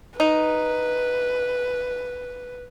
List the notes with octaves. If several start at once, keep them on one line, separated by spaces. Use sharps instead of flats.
D#4 B4